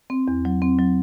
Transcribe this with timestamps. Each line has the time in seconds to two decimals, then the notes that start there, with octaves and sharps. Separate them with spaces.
0.10 C4
0.28 E2
0.45 F#3
0.62 C4
0.79 F#3